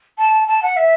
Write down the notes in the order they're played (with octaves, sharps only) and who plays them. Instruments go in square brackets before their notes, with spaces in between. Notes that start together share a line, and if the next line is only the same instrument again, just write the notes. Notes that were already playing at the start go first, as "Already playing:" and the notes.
[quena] A5
A5
F#5
E5